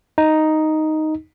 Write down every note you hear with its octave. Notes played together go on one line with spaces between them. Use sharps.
D#4